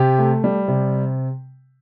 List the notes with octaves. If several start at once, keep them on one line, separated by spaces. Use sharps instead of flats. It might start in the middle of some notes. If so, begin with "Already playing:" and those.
Already playing: C3 G4
A3
G3
C3